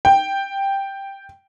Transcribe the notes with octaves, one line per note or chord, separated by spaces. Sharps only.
G5